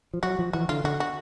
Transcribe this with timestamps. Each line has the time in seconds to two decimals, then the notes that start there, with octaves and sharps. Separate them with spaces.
0.14 F3
0.23 F#3 F#4
0.39 F3
0.53 E3 F#4
0.69 D3 F4
0.84 D3 F#4
1.00 F#4